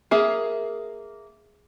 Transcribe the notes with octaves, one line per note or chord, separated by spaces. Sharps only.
A#3 G#4 E5